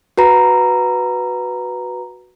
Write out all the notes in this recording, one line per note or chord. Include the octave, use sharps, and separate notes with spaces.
F#4 B4 A#5